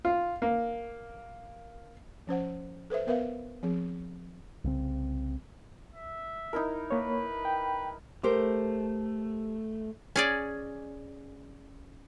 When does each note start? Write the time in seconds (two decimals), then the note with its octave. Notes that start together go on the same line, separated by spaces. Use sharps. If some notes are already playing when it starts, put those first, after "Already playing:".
0.05 F4
0.42 A#3
2.27 F3 C#4 C5 F#5
2.90 A4 B4 C5 E5
3.07 B3 A#4 B4 E5 F5
3.63 F3 C4 G#4
4.64 C2 C#3 C4
5.93 E5
6.53 D#4 E4 A#4
6.91 A#3 B4 C#5
7.45 G5
8.23 A3 G4 A#4 C5
10.16 C#4 G#4 D5